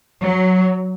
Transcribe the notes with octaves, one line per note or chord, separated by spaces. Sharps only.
F#3